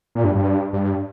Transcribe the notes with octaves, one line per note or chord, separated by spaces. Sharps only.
A#2
G2
G2
G2